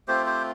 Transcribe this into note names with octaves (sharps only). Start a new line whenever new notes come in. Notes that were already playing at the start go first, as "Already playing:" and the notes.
A3 C4 F4 G4 C5
G4 C5